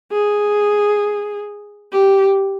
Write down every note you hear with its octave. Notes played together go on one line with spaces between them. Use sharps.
G#4
G4